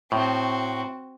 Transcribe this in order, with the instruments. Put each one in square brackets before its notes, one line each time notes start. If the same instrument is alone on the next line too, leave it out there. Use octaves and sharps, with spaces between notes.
[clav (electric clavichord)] A2 [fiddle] C4 F#4